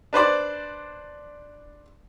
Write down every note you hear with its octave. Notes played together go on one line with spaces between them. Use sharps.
D4 B4 C5 D5